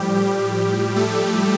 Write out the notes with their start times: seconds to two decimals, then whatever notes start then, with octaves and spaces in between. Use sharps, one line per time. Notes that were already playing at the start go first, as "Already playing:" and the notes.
Already playing: A2 F3 G3 G4
0.15 G3 G4
0.96 A3 A4